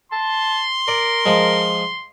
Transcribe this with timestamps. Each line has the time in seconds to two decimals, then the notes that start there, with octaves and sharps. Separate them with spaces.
0.12 A5 C6
0.88 A#4 D5
1.25 F3 G#3